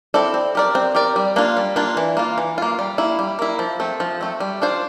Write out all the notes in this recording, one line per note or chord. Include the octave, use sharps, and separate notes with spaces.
C4 E4 A4 D5
C4
G4 A#4 D5
C4
G4 A#4 D5
G3
A#3 D4 F4
G3
A#3 D4 F4
E3
A#3 F4
E3
A#3 F4
G3
A#3 E4
G3
A#3 E4
F3
A3 C4
F3
A3 C4
G3
D4 F4 C5